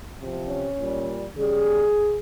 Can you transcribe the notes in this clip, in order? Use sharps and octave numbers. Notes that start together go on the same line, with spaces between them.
C3 F3
C#4
A#2 G3
C#3 G3 G#4